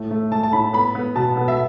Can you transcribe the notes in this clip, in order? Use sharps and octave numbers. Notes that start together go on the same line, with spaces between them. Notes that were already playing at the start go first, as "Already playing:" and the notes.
Already playing: A2 A3
A3
A3 A5
A5
A2 B5
B3 B5
B3
B2 A5
B3
E5